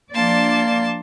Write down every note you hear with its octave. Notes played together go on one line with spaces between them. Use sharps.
F3 A#3 D4 D5 A5 C6